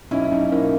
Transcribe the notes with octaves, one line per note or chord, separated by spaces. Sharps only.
B1 C#4 E4
B1 D#4
A#3 C#4 E4